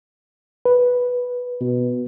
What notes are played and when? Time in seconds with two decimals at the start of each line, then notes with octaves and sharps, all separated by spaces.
0.65 B4
1.60 B2